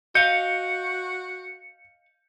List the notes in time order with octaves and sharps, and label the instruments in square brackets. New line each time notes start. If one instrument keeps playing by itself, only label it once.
[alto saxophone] F#4 [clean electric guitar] D#5 F5 [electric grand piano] G6 [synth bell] C#7